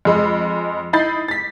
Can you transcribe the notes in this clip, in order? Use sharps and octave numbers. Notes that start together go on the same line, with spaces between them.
F2 G#3 B5
D#4 E4 B5 G6 A6 C7
A6 B6